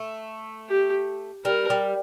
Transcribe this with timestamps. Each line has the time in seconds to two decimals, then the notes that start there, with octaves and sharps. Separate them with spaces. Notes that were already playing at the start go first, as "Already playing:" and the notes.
Already playing: A3
0.69 G4
1.45 G3 A#4
1.70 G3